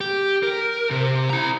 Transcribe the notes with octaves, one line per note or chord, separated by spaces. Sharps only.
G4
A#4
C3
E4 A#5